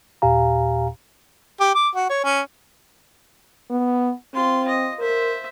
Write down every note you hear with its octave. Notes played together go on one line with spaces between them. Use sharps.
D#2 A#2 G4 F5 G#5 A#5
G4
D6
F#4
C#5
C#4
B3
C4 F4 C6
D#5
A#4 C5 E5